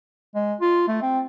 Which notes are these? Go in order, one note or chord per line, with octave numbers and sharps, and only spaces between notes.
G#3
F4
A3
C4